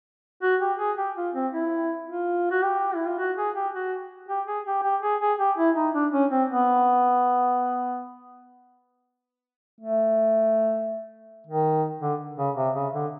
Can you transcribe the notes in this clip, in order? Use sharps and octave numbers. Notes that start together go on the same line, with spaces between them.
F#4
G4
G#4
G4
F4
C4
E4
F4
F#4
G4
E4
F4
F#4
G#4
G4
F#4
G4
G#4
G4
G4
G#4
G#4
G4
E4
D#4
D4
C#4
C4
B3
A3
D#3
D3
C#3
C3
C#3
D3